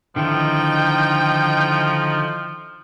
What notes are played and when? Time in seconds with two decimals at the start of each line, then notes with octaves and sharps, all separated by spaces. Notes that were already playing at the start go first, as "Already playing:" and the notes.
0.16 D3 D#3 F3 D#4 E4 G5